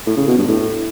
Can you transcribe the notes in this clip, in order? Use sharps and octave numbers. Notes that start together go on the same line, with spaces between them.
A2
C#3
B2
G2
A2